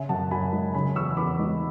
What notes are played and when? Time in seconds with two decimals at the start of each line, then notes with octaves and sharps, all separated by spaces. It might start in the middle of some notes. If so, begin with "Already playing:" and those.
Already playing: C#3 E5 G#5
0.09 F#2 F#5 A5
0.31 F#2 G#5 B5
0.53 G#3
0.74 C#3 G#5 B5
0.96 E2 C#6 E6
1.17 E2 B5 D6
1.39 G#3